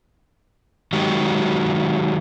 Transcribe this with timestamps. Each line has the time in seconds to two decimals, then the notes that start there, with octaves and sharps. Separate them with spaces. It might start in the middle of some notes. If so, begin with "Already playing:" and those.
0.93 D#3 F#3 G#3 F#4 G4